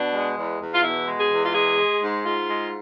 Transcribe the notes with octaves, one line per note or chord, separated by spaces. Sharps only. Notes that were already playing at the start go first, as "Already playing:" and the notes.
Already playing: B2 D4
G#3
E2
E2
F4
B2 E4
G#3
G#4
E2
F4
G#3 G#4
G#3
G#2
G#2 F4
G#3